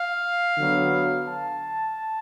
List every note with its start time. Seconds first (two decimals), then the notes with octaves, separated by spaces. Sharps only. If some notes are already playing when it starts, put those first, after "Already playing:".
Already playing: F5
0.57 D3 F#3 B3
1.27 A5